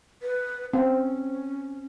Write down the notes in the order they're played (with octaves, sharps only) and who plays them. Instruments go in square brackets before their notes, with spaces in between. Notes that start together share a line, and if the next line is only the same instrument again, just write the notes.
[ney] B4
[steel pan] C4 [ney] C#4